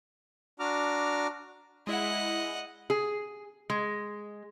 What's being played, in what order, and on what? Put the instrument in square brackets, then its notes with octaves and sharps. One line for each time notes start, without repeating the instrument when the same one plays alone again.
[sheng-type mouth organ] D4 F#4 A#5 D6 F6
[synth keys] G#3 E4 [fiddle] D#5 F#5
[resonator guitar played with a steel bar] G#4
G#3